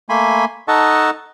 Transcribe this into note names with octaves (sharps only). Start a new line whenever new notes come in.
A3 A#3 G#5 B5 C6
D#4 A4 D#5 F#5 A5 C#6